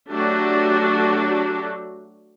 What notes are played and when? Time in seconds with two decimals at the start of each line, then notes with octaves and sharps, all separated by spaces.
0.11 F#3 A3 D4 F#4 G4